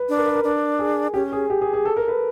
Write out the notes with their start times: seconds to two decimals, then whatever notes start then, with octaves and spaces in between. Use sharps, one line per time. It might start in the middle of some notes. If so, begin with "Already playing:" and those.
Already playing: B4
0.09 D4
0.17 A#4
0.26 B4
0.35 A#4
0.44 D4
0.79 G#4
1.14 C#4 G4
1.32 G#4
1.50 G4
1.61 G#4
1.73 G#4
1.85 A4
1.97 A#4
2.08 B4